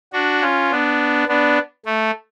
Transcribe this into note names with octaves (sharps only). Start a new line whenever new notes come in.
D4 F#4
C#4 F4
B3 D4
B3 D4
A3